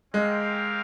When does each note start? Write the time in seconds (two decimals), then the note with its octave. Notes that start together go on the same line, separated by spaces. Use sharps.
0.14 G#3 C4 G4 A#4 F5